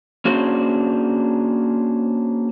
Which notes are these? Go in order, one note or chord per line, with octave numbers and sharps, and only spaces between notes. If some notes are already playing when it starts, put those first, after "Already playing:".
A#3 C#4 D4 F#4 G#4 C5